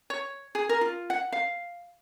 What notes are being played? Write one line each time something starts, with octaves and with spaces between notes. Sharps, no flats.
C#5
G#4
A#4
F4
F#5
F5